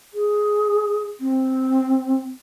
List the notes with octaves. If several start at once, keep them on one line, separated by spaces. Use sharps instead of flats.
G#4
C4